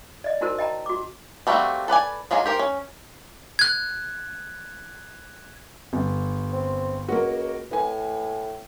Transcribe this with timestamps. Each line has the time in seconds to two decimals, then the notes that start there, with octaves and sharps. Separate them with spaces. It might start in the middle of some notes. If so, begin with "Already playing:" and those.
0.24 D5 D#5
0.41 D#4 E4 F#4 A#4 C5 A5
0.58 D#5 G5 A5 A#5
0.86 F#4 D6
1.47 G3 A3 A#3 C4 F#4
1.88 A4 B4 D5 G#5
2.31 F#3 G#3 A#3 F4 G#4
2.46 G4 A#4 C5
2.59 C#4
3.59 F#6 G#6
5.93 G1
6.52 C4
7.08 C#2 A#3 F#4
7.71 A2 B4 G#5